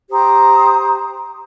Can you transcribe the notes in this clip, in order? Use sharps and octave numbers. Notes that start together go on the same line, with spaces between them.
G4 C5 A#5 D#6